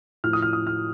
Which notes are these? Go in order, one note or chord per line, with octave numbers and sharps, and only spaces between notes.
A2 F3 F6
D#6
F6
D#6
F6